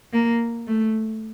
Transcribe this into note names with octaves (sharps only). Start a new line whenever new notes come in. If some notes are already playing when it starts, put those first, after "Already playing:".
A#3
A3